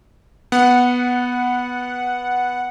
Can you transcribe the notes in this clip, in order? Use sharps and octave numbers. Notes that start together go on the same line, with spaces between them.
B3 F#5